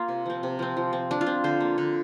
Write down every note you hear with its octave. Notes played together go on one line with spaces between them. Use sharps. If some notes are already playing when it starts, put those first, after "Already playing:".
Already playing: A#3 F4
C3
F3 C4
C3
F3 C4
F3
C4
F3 D4
F4
C4
D3 C5
A#3
D3